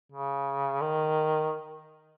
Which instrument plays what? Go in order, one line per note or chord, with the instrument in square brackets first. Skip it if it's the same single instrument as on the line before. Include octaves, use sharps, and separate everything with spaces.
[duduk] C#3
D#3